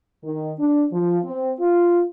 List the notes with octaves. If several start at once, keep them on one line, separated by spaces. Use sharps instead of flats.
D#3
D4
F3
C4
F4